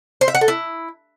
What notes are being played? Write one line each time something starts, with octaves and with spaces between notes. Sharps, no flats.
C5
E5
F#5
A4
E4